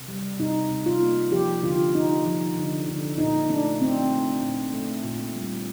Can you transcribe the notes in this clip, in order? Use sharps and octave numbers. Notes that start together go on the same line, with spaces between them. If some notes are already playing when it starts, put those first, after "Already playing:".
Already playing: C3
G3
C3 D#4
C3
F4
A#3
F3 G4
D3 F4
D3 D#4
F3
D3
D3
A#2 D#4
A3 D4
A3 C4
A3
A#2
A3
A#2
G3